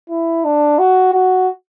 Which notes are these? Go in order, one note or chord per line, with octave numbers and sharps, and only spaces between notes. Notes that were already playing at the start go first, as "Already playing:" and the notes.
E4
D4
F#4
F#4